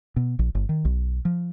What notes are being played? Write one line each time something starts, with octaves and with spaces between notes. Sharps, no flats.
B2
A#1
G1
D#3
B1
F3